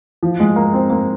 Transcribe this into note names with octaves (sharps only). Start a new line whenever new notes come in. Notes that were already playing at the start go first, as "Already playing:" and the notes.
F3
G#3
A#3
C4
A#3